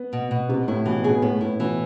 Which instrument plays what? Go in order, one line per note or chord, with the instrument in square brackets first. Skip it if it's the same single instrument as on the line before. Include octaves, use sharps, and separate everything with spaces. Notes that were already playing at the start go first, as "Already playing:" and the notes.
Already playing: [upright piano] B3
[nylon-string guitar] B2
B2
[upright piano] C3 [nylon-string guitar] B3
[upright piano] A2 [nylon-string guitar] E4
[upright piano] B2 [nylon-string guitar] E3
[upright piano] B2 [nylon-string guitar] G#4
[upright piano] A2 [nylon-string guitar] B3
[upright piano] A2 [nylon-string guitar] E4
[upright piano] B2 [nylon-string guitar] E3